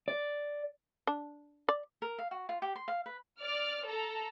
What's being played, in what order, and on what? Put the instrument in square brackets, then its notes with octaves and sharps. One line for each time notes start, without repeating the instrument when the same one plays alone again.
[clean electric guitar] D5
[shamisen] D4
D5
[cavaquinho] A#4
F5
F#4
F4
G4
C6
F5
B4
[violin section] D5 F6
A4 A#5